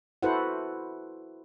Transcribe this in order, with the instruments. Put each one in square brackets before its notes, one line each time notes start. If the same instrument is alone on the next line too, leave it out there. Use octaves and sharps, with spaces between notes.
[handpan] E4 F#4 A4 B4 C5 F#5